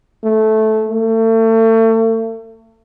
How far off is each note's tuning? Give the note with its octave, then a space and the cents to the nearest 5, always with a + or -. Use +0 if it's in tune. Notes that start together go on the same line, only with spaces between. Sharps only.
A3 -15
A3 +35